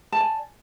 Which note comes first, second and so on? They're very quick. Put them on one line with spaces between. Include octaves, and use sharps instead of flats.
A5 D5 G#5